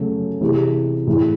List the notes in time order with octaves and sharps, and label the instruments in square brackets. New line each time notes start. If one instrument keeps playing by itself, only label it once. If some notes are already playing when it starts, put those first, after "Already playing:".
Already playing: [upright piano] C#3 F#3 A3
C3 E3 G#3
A2 E3 G#3